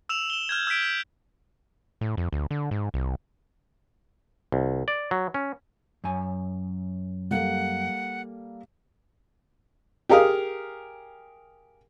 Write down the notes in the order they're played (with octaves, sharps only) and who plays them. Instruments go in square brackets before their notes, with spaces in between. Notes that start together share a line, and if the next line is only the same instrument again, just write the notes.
[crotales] E6 E7 F7
E7 G7
F6 G6 G#6
E6 G6 G#6 B6 D7
G6
[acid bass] A2
F2
D2
D3
G#2
C2
[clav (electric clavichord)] C2
D5
F#3
C#4
[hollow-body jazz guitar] F#2 G#5
[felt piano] G3 A#3 A4 [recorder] F#5
[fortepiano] G4 G#4 A#4 F5 D#6